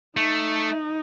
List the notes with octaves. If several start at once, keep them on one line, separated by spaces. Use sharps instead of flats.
A3 D#4